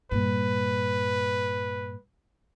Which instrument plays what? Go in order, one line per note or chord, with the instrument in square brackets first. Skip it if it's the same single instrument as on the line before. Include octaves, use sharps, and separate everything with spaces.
[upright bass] G2 A#2 [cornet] B4